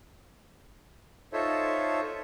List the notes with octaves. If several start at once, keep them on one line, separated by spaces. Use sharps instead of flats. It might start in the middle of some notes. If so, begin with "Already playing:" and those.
D#4 F4 A4 C5 C#5 E5